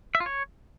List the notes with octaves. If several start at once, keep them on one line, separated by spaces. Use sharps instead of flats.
E5
F4
C#5